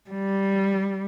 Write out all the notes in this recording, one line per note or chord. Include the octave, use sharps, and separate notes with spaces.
G3